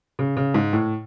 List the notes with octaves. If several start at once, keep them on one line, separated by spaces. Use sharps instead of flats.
C#3
C#3
G#2
A2